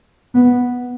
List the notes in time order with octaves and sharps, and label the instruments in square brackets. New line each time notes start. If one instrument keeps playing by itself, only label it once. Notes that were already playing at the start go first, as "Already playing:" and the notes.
[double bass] B3